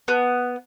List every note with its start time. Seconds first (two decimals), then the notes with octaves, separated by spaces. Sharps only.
0.08 B3